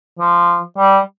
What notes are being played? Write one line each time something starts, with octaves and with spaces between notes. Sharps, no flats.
F3
G3